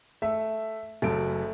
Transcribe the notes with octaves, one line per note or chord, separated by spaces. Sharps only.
A3 E5
F#1 F#2 A3 D7